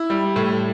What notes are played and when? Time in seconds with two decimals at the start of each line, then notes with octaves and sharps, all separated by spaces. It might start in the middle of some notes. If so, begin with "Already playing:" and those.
Already playing: E4
0.10 G3
0.36 A2